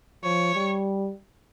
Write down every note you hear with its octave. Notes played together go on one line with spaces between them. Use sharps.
F3 C#5
G3